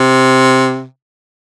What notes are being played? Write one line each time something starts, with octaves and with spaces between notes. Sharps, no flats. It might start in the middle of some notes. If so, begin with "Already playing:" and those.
Already playing: C3